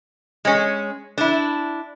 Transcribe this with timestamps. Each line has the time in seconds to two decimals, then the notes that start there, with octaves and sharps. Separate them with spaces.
0.45 G#3 C#4
1.18 D4 E4